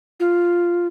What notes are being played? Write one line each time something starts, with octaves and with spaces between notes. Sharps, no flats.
F4